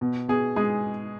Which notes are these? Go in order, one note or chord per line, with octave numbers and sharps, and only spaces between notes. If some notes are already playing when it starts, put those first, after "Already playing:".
B2
B2 G#4
G#3 G#4